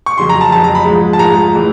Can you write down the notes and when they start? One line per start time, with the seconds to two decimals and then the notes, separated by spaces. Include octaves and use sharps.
0.06 C#6
0.18 F2 C#3 F#3 C6
0.29 A#5
0.41 A5
0.52 F2 C#3 F#3 A5
0.64 A#5
0.75 B5
0.85 G#2 F3 G#3
1.13 A5
1.19 G#2 F3 G#3 A#5
1.54 A2 E3 G#3